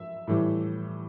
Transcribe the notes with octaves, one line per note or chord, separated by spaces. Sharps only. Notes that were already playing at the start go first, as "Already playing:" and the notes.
Already playing: E5
A2 E3 G3